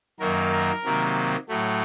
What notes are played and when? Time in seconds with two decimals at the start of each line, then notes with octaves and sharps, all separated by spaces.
0.19 F#2 D#3 F#3 A#3 A#4
0.52 A#4
0.84 C3 D#3 F#3 A#3
1.49 A2 F#3 A3